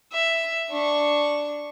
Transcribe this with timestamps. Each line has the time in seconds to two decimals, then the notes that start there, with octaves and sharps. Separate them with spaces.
0.12 E5
0.70 D4 C#6